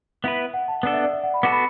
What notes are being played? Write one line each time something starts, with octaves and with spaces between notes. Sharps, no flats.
B3 E4 B4 E5
F#5
A5
B3 D4 A4 F#5
E5
D5
E5
F#5
B5
B3 F#4 A4 D6
B5